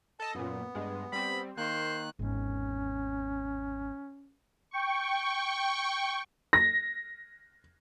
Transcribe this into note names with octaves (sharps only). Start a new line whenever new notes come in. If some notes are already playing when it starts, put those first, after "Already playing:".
A4 D#5 A5
F#2 A#2 B3
G2 G#3
G3 C4 B5
D#3 A#3 C5 F#6
G#1 E2 C#4
G5 C#6
A#6